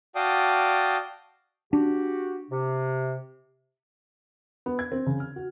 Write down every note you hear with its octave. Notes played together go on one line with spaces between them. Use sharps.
F#4 D5 F5 G5 A5 D#6
D4 F#4 G4
C3
B3
G#6
C4
C#3
F6
F#4